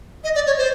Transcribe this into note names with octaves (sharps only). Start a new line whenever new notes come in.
D#5
D5
C#5
C5